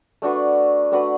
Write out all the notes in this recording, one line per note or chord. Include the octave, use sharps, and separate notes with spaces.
A3 D4 F#4 B4
A3 D4 F#4 B4